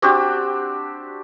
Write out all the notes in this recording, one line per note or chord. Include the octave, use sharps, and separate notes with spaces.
C4 D4 F#4 G4